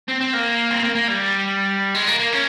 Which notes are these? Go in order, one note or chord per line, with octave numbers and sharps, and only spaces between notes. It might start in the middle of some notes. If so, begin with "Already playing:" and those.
C4
C4
A#3
C4
A#3
A#3
G3
G#3
A#3
A#3
C#4